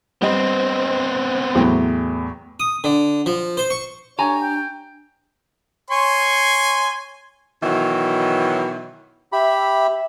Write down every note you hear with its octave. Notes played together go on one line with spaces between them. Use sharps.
G3 B3 C4 D#5
E2 A2 F#3 G5
D#6
D3
F3
C5
C#6
D4 G4 C#5 G#5 A#5
G5
C#5 G#5 C6
B2 D#3 E3 F#3
G4 E5 B5